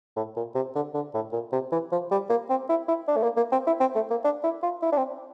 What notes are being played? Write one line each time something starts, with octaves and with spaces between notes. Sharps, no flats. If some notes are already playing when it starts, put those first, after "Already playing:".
A2
A#2
C3
D3
D3
A2
A#2
C3
E3
F3
G3
A#3
C4
E4
E4
D4
A3
A#3
A#3
C4
E4
C4
A3
A#3
D4
E4
F4
E4
D4
C4